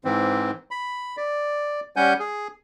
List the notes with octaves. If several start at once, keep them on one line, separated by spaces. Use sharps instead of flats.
G#2 E3 C4
B5
D5
G3 C#4 F#5 G#5 G6
G#4